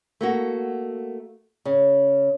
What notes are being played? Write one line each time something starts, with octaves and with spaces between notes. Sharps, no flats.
A3 A#3 F#4
C#3